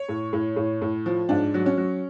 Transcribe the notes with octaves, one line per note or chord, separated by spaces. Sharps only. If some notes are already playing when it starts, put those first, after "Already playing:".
Already playing: C#5
A2
A2
A2
A2
F3
G#2 D4
F#3
C#4
F#3